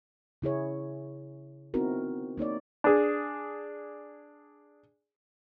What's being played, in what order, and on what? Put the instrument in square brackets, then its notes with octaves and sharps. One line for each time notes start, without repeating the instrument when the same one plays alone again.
[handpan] C#3 E4 G#4 C#5
B3 C4 D#4 E4 F#4 A#4
A#3 D#4 C#5 D5
[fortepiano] D4 G#4